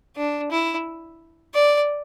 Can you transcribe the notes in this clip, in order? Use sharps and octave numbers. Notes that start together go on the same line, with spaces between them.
D4
E4
D5